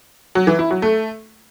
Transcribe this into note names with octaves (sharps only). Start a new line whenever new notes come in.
F#3
E3
E4
F#3
A3